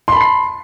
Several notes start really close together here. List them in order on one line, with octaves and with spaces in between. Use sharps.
C6 B5 A5 C7